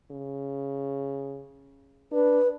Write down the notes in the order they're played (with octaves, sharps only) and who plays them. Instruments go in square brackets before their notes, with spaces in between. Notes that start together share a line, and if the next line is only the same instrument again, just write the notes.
[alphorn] C#3
[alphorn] D4 [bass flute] B4